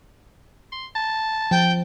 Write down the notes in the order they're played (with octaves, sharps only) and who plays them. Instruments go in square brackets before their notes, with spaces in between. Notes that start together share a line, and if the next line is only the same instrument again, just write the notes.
[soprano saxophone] C6
A5
[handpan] F3 [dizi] G5